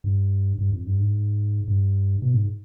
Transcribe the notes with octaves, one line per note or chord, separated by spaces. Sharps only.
G2
G2
F2
G2
G#2
G2
B2
G#2